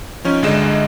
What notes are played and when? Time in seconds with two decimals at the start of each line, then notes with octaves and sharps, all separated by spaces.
0.25 F3 C#4 D#4
0.42 G1 D2 D3 G#3 D#5 E7